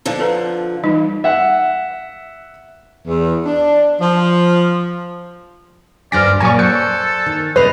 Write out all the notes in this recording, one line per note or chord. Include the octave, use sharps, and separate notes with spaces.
D3 F3
A4 B4 A#5
E3 G3 D#4
E5 F#5
E2
D4
F3
D2 G2 C5 D5 G#5 F6 A#6
A#2 F#3 C#4 G#5 C#6 G#6
A4 C5 F#6 G6 C#7
D#3
C3 A3 B4 D#5 F#6 C7 F7